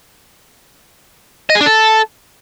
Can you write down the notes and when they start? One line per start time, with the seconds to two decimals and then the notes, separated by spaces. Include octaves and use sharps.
1.50 D#5
1.55 G#4
1.61 D4
1.66 A4